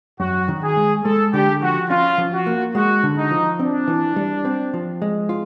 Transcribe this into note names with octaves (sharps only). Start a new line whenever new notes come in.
F#2 F#4
D#3
G#4
G#3
G#3 A4
D3 G4
F3 F#4
C#4 F4
F3
F#4
A#3
G#3 F#4
D3
D#4
F3
C4 D4
E3
G3
C4
F3
G#3
F4